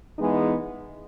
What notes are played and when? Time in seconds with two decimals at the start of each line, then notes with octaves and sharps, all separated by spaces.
0.18 E3 G#3 B3 D#4 G#4